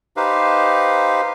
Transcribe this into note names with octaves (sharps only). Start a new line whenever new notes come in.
D#4 G4 B4 C5 F5